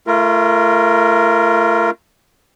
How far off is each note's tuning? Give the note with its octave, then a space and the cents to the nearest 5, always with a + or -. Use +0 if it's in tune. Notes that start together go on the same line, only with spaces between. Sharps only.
A3 -5 F4 -35 A#4 +0